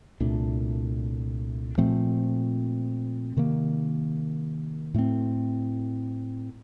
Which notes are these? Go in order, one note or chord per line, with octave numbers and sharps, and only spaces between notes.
C2 A#2 A3 D4
A#2 F3 A3 C4
C3 D#3 A#3
A2 A3 C4